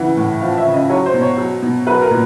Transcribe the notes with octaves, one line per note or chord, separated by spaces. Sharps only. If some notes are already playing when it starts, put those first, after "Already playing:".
Already playing: C#3 E3 F#5
A2
F3 F5
E5
C#3
D#5
F#3 C#5
C5
B2
C#5
F#3
B2
F#3 B4
A#4
A#2